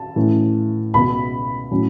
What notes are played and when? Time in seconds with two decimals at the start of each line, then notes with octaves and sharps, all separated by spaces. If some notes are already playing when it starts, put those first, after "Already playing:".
Already playing: A5
0.16 A2 E3 C#4
0.94 C#2 B2 B3 B5
1.71 A2 F#3 C#4